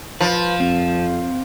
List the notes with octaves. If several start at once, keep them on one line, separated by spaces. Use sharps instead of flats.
F3 B4
F2 C4